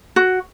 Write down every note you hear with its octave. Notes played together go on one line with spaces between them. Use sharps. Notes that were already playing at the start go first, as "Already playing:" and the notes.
F#4